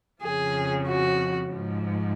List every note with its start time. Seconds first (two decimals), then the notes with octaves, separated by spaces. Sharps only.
0.21 F2 C#3 F3 G#4
0.87 F#4
1.54 G#2 F3